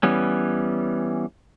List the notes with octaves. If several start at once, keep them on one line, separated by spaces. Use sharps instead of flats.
E3 G3 B3 C#4